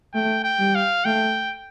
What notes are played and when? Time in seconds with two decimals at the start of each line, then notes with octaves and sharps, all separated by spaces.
0.14 A3 G5
0.44 G5
0.59 G3
0.75 F5
1.05 A3 G5